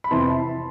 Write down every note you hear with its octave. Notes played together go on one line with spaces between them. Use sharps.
B5
F2 C3 E3 A5 C6